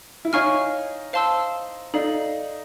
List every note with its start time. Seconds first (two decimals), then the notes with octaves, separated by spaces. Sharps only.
0.25 E4
0.33 D#4 C#5 F5 G#5 C#6 F6
1.13 C5 F5 A5 C6 E6
1.94 D#4 A4 D5 F5